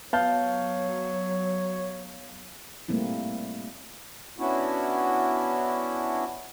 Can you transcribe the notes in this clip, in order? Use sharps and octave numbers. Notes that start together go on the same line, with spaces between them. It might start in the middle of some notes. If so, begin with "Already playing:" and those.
F#3 B3 C#5 F5 A5 G6
G3 A3 A#3 C4 E4
B3 C#4 D4 E4 F#4